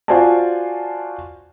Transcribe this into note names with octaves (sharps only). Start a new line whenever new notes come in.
F4 F#4 C5 D5 G#5 A5